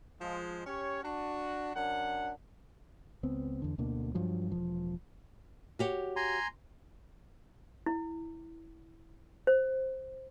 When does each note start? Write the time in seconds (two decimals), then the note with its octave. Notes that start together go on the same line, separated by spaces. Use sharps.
0.21 F3 G#3
0.67 C#4 G4 C#5
1.04 D4 F#4
1.76 F#2 D4 F#5
3.23 C#2 B3 C4
3.62 E2 D3
3.78 D2 B2 D3 A#3
4.15 G2 F3 F#3
4.51 E1 F3
5.79 F#4 G4 C#5
6.16 G#5 A#5 C6
7.86 E4
9.47 C5